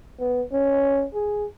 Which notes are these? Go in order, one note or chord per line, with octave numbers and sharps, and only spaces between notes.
B3
C#4
G#4